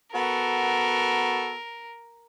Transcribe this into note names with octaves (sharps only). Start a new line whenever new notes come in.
B3 F#4 A4 A#4